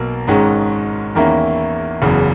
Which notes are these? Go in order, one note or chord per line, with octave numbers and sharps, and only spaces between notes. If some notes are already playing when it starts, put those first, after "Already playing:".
Already playing: B1 B2 A#3
G#1 G#2 D#3 G#3 C#4
E2 D#3 A#3 C#4 E4
F#1 E2 C#3